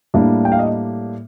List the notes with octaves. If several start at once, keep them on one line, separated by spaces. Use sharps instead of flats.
A2 G3 A#3 D4
G5
F5
D#5